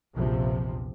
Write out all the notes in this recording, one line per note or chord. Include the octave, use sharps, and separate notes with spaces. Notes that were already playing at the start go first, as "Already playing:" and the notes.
A#1 E2 C3 F3